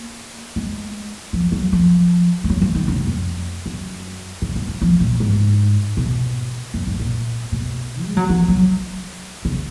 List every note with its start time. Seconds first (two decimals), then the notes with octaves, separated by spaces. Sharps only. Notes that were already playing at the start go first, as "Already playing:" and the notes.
Already playing: A#3
0.56 G#3
1.33 F3
1.52 F#3
1.72 F3
2.44 G#3
2.50 F#3
2.61 F3
2.75 D#3
2.88 F#2
3.07 F2
3.66 F#2
4.42 C#3
4.55 F3
4.68 F3
4.82 F3
5.00 A#2
5.20 G#2
5.97 B2
6.74 F#2
6.87 G#2
7.00 A#2
7.52 B2
8.03 G#3
8.17 F#3
8.29 F3
8.48 F#3
9.45 C#3